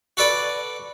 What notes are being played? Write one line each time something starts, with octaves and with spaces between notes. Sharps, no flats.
F#4 A4 B4 D5